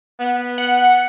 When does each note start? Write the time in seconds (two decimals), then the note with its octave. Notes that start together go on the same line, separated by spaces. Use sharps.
0.19 B3
0.58 F#5